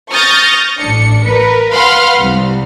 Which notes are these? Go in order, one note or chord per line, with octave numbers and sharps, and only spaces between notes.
C#6 D#6 F6 G6 A6 A#6
A1 D4 C#7
A#4 B4
B4 F5 F#5 B5 C6 F6
C2